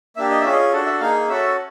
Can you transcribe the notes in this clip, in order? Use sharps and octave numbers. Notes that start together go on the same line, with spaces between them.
A#3 D4 G4 E5
D#5
C#4 F4 G#4 E5
D#5
D4 F#4 A4
E5
A#3 D#4 G#4 F5
C#4 F#4 A4 E5